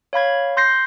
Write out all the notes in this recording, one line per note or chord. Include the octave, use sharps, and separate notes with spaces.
C#5 F5 B5 G#6
C6 G6 A#6 C7